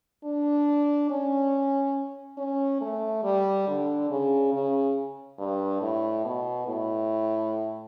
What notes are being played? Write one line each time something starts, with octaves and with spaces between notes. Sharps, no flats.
D4
C#4
C#4
A3
G3
D3
C#3
C#3
G2
A2
B2
A2